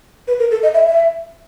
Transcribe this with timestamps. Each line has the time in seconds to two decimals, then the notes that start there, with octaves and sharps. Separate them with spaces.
0.28 B4
0.39 A#4
0.51 A4
0.63 D#5
0.74 E5
0.86 E5